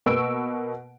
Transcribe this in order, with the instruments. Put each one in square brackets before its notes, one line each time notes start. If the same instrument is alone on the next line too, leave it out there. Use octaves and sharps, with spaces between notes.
[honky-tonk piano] B2 A#3 B4 C#6 E6 D7